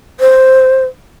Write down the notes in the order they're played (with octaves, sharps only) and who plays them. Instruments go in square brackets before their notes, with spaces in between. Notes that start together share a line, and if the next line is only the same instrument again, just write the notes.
[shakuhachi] C5